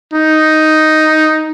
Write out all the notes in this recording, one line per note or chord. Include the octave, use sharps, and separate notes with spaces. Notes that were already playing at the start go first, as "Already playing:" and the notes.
D#4